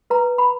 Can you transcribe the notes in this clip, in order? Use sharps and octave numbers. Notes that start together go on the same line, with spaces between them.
B4 A#5
B5